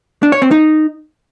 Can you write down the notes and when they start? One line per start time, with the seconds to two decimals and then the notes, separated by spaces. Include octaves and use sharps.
0.23 D4
0.32 C#5
0.42 C4
0.51 D#4